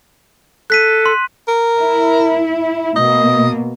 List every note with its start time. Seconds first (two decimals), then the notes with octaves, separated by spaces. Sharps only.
0.70 A4 F#6 B6 D#7
1.06 C6
1.48 A#4
1.79 E4
2.96 B2 A#3 D#5